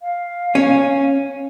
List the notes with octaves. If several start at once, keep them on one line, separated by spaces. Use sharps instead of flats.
F5
C#4